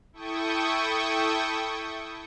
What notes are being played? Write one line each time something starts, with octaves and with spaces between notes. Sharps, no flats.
E4 A4 G5 C#6 D#6